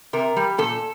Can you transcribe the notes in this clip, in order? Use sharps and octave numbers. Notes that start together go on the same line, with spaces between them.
C3 A#4
G3
A#2 A4